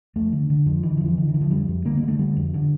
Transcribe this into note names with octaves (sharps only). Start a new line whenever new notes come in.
F2 A3
D3
D3
F2 F3
D3 E3
F3
F2 E3
D3
E3
D3
F3
F2 G3
F2
D3 A#3
A#3
D3 A3
D3 G3
F2
D3